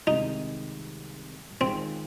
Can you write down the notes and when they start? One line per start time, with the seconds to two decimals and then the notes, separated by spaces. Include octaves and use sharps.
0.07 C2 C3 D#3 G#3 D#4
1.61 D#3 G#3 C4 F4 G#4